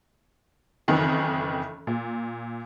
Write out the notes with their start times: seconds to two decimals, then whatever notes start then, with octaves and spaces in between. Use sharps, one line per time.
0.88 F#1 F2 D#3 E3
1.87 A#2